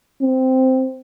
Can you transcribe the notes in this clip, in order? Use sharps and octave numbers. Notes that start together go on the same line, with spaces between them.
C4